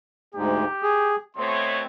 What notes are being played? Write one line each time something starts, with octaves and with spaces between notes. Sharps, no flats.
D2 G#2 G4
G#4
B2 A3 C4 C#5 C6